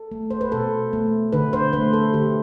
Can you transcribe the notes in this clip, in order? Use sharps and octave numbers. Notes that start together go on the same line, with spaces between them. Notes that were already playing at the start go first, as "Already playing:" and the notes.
Already playing: A4
A3
C5
B4
B2 A4
A3
D3 B4
C5
A3 B4
A4
D3 G4